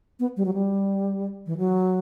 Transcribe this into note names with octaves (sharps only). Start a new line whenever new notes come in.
B3
G3
F#3
G3
E3
F#3